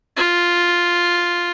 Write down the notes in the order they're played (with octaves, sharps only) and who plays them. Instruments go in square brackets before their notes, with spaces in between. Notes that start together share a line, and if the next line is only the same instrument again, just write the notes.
[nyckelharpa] F4